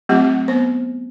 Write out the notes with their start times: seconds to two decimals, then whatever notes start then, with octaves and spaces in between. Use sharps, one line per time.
0.09 F#3 A3 C4 F4 G4 F#5
0.48 B3 C5